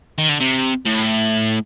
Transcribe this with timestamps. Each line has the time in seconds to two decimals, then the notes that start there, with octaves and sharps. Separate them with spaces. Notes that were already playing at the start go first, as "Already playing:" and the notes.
0.18 D#3
0.29 D3
0.40 C3
0.86 A2